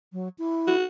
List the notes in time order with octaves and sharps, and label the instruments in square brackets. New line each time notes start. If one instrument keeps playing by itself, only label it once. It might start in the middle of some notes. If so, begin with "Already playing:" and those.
[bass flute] F#3
E4
[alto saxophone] F#4